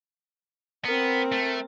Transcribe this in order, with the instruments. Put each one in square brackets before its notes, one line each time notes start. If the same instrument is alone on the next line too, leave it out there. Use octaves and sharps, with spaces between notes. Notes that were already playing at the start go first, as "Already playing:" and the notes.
[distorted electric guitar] B3 [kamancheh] C4 A#4
[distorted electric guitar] A3